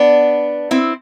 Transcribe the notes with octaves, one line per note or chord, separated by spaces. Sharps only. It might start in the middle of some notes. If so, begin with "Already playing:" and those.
Already playing: B3 D4
C4 E4